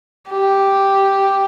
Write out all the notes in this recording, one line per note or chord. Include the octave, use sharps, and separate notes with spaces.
G4